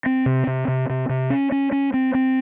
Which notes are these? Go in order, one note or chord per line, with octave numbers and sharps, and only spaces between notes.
C4
C3
C3
C3
C3
C3
C#4
C#4
C#4
C4
C4